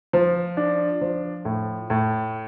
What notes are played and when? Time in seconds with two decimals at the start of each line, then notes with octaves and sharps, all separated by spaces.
0.13 F3
0.57 D4
1.01 F3
1.45 A2
1.90 A2